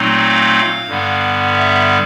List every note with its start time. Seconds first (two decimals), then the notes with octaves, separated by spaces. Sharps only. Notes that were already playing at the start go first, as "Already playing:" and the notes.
Already playing: A#2 F#3 A3 C4 D#4
0.19 F5
0.88 G2 D3 G3 B3
1.57 E5